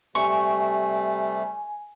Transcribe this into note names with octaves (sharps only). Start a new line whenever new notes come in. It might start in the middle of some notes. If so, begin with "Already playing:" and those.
C3 G3 A3 G#5 C#6